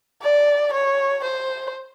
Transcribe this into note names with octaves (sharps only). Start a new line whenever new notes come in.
D5
C#5
C5